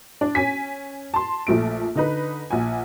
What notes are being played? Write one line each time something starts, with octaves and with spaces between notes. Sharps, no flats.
D4
C#4 G#5 B6
A5 C6
A#1 F3 A3 D7
D3 D#4 B4
A#1 F#5 G#5